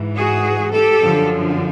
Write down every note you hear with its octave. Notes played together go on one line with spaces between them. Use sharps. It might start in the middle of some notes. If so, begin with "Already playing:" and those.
Already playing: G#2 E3
F#4 G#4
G4 A4
F#2 D3 F3